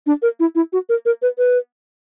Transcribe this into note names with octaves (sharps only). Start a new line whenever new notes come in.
D4
A#4
E4
E4
F#4
A#4
A#4
B4
B4